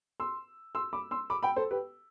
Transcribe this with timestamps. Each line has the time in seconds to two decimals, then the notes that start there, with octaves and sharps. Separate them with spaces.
0.20 C6 E6
0.75 C6 E6
0.93 B5 D6
1.11 C6 E6
1.30 B5 D6
1.43 G5 B5
1.56 A4 C5
1.71 G4 B4